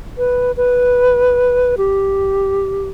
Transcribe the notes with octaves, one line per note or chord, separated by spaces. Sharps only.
B4
B4
G4